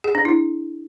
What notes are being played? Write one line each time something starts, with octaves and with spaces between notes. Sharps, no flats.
G#4
D4
E4